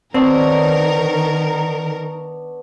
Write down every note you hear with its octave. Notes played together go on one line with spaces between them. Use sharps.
D#3 B3 C4 D4 A#4 C#5